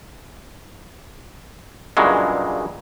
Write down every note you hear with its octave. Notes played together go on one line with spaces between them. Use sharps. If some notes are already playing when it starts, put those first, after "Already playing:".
G2 A#2 C#3 E3 F#3 G#3